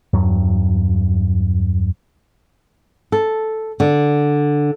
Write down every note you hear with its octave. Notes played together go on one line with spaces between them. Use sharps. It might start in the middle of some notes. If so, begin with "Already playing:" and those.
E2 G2 F#3
A4
D3